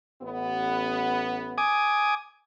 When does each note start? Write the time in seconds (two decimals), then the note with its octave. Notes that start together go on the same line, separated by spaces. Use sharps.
0.22 A1 B3
1.58 G#5 D6 D#6